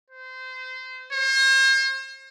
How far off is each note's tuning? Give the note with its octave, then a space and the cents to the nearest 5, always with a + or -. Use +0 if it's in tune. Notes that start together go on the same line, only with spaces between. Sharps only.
C5 -25
C5 +40